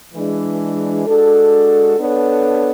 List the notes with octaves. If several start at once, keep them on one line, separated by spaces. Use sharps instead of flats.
E3 G#3 D4
G#3 D4 F#4 A4
B3 D4 A4 C#5